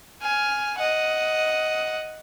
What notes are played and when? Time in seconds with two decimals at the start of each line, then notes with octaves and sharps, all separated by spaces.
0.22 G#5 F6
0.78 D#5 F#5